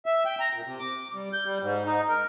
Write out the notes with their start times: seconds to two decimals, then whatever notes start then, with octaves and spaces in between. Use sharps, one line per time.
0.06 E5
0.25 G5
0.40 A#5
0.53 A#2
0.65 C3
0.79 D6
1.14 G3
1.33 G6
1.45 G3
1.62 G#2
1.86 D#4
2.09 A#4